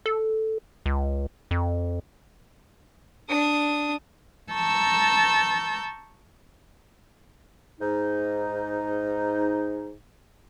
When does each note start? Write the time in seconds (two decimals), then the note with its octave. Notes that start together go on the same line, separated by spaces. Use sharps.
0.06 A4
0.86 C#2
1.51 F2
3.29 D4 D#6
4.52 A5 A#5 C#6 E6 G6
7.80 G#2 D#4